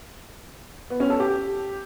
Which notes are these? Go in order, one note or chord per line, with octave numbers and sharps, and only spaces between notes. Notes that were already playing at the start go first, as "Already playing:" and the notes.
B3
C#4
A4
G4